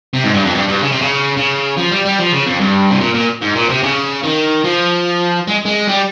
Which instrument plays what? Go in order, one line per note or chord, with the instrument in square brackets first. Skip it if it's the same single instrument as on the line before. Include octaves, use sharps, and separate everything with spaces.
[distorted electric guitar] C3
G#2
G2
F2
G2
G2
C#3
C3
C#3
C#3
F3
G3
G3
F3
C#3
F2
G2
C3
A#2
A#2
G#2
A#2
C3
C#3
D#3
F3
G#3
G#3
G3